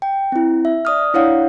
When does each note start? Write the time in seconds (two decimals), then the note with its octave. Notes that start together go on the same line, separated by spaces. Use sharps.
0.02 G5
0.32 C4 E4
0.65 E5
0.85 D5 D#6 F6
1.14 D4 E4 C#5 F5 F#5